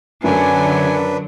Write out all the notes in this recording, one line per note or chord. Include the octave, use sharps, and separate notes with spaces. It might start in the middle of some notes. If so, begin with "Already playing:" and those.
F#2 D3 F#3 D4 B4 G#5